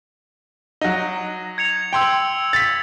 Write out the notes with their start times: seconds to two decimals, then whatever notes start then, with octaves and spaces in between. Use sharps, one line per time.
0.81 F#3 D#4
1.58 G#6 C#7 F7
1.93 G5 C6 E6 G#6 F7
2.53 A6 B6